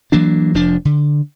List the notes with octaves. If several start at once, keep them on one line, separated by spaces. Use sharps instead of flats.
E3 F#3 A#3 D4
F1 F3 D4
D3